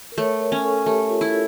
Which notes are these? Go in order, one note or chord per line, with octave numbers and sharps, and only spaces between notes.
A#4
A3 C#5
A#4
C#4
A4
A3 G4
F4
E4 A4